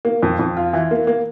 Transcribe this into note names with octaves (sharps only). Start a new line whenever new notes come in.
A#3
F2
F2
F4
E3
A#3
A#3